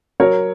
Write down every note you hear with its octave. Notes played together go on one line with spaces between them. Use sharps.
F#3 A#4 C#5